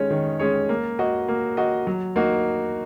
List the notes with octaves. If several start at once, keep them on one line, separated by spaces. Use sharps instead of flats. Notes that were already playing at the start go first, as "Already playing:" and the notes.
Already playing: D#3 G#3 C#4 G#4 C#5
D#3
G#3 C#4 G#4 C#5
A#3
F#4 D#5
A#3
F#4 D#5
F#3
A#3 D#4 F#4